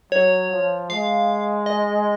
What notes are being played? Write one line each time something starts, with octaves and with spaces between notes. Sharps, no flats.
F#3 C#5
F3
G#3 F5
D#5